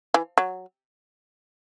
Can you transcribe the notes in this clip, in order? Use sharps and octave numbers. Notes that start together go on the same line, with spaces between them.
E3
F#3